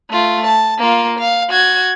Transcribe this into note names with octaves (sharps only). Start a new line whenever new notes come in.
A3 F4
A5
A#3 F4
F5
F#4 G#6